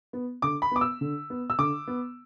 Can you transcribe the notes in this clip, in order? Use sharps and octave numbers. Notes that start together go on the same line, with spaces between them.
B3
D3 D6
B5
B3 D6
E6
D3
B3
E6
D3 D6
B3